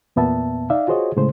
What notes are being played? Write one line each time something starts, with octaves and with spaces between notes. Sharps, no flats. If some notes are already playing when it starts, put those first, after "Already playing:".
E2 A#2 B3 E5 A5
D#4 D5 E5 F5
F4 F#4 G#4 C5 C#5 D#5
A2 C#3 G#3 A3 C5